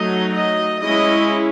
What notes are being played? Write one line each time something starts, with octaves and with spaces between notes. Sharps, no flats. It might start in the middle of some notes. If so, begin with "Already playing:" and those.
Already playing: F#3 A3 D#4 D#5
D#5
G#3 C#4 E4 D#5